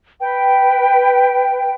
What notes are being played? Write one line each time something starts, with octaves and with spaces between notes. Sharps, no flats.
B4 G5